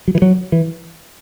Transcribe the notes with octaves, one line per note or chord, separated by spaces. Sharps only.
F#3
E3
F#3
E3